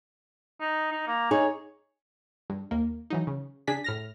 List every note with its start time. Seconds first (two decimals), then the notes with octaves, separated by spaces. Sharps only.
0.60 D#4
0.92 D#4
1.07 A#3
1.31 D#4 G#4 C#5
2.50 G2
2.71 D#2 A#3
3.10 E3 F#3 D#4
3.27 C#3
3.67 C#3 D4 G#4 B6
3.84 A2 F6 A#6